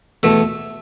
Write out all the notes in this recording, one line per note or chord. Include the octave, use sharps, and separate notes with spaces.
E2 B2 A3 E5